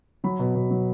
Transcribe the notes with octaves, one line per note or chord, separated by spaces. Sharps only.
F#3 B5
B2
B2
F#3